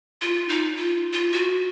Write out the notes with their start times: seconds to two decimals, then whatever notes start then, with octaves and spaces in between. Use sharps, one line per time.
0.21 F4
0.49 D#4
0.76 F4
1.13 F4
1.32 F#4